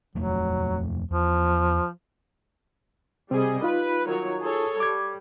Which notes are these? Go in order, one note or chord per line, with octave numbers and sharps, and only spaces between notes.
D#1 F2 F#3 A3
E2 F3
C3 G3 C4 G#4 D#5
D#4 F4 B4
D#3 F#3 C#5
G#4 A4 C#5
G3 D6 G#6